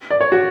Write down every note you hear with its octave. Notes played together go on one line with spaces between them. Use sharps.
D5
C#5
F#4